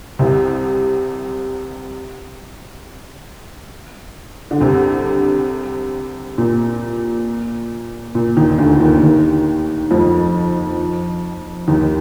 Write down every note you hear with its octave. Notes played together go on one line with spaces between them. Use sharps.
C2 C3
D3
C2 C3
A#2
A#2
D#2 D#3
D2 D3
D#2 D#3
D#2 D#3
F2 F3
D#2 D#3